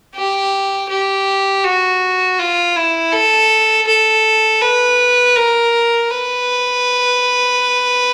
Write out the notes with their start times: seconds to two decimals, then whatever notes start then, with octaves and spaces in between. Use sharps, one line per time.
0.16 G4
0.89 G4
1.64 F#4
2.39 F4
2.76 E4
3.13 A4
3.87 A4
4.62 B4
5.36 A#4
6.10 B4